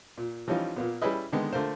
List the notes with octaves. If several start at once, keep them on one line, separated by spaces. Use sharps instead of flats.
A#2
E3 F3 G3 C#4 D#4 F4
A#2 A#3 B3
G3 C#4 E4 G#4 B4 D#5
D3 D#3 G#3 B3
D3 A3 F4 A#4 C5